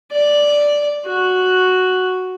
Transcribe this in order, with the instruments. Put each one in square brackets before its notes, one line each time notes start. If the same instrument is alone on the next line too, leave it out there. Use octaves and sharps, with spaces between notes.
[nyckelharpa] D5
F#4